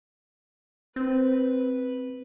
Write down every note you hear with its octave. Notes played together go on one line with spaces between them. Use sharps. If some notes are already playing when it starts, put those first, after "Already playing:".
C4 B4